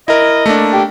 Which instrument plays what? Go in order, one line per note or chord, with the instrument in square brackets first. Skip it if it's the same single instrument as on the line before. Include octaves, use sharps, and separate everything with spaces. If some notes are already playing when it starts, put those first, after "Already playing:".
[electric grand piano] E4 A#4 [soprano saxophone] D#5
[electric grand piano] A3 A#3 D4
[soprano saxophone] G4